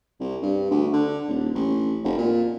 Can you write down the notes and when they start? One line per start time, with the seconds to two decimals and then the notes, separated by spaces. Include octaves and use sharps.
0.20 C2
0.42 G2
0.71 D2
0.93 D3
1.28 D#1
1.55 A1
2.04 F1
2.18 A#2